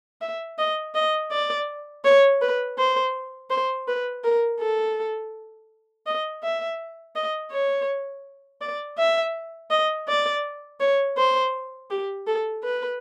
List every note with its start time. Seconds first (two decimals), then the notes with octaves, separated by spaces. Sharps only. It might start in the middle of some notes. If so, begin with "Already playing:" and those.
0.21 E5
0.58 D#5
0.95 D#5
1.31 D5
2.04 C#5
2.41 B4
2.78 C5
3.50 C5
3.87 B4
4.24 A#4
4.60 A4
6.06 D#5
6.43 E5
7.15 D#5
7.52 C#5
8.61 D5
8.98 E5
9.70 D#5
10.08 D5
10.80 C#5
11.17 C5
11.90 G4
12.27 A4
12.64 B4